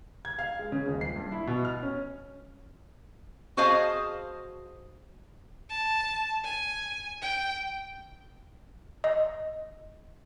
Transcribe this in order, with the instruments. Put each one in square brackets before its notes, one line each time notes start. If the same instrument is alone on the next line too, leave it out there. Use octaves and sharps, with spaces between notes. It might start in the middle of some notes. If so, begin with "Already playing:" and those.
[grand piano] G#6
F5
G#3
C#3
D#1
C7
G2
E4
B2
F6
C#4
[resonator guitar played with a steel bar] F#4 G#4 C5 D#5 F5 A5
[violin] A5
G#5
G5
[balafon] D#5